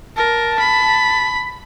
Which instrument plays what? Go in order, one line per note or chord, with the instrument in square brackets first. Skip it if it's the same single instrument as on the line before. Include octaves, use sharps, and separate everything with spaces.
[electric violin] A#4 [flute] A5
[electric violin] B5